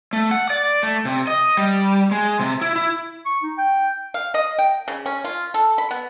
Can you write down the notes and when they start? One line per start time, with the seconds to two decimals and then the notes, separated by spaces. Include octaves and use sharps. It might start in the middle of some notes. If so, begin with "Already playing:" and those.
0.13 A3
0.31 F#5
0.50 D5
0.83 A3
1.05 C3
1.27 D#5
1.57 G3
2.11 G#3
2.39 C3
2.61 E4
2.75 E4
3.26 C#6
3.43 D#4
3.58 G5
4.14 F5
4.34 D#5
4.59 G5
4.88 C#3
5.06 C#4
5.24 F4
5.54 A4
5.78 B5
5.91 B3